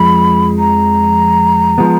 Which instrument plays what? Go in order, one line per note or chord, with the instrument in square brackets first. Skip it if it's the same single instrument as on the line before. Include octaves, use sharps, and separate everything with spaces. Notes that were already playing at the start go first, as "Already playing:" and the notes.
Already playing: [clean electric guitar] F2 F3 G#3 [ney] B5
[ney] A#5
[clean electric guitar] F3 G#3 B3